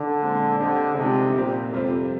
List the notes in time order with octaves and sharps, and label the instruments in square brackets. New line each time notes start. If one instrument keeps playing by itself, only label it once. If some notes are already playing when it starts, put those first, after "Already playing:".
Already playing: [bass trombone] D3
[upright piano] A#2 G#3 C4
[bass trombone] D3 [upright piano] G3 C4 G4 C5 D#5
[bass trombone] C3 [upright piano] F3 G#3 D#4
[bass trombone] A#2 [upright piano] G3 C4 G4 A#4
[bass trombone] F2 [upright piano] C3 G3 C4 F4 C5